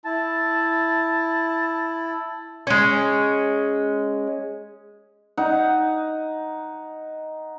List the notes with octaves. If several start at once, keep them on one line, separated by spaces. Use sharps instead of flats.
E4 A5
G#3 C#4
D#4 F#5